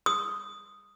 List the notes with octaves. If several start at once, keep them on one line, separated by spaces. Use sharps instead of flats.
D#6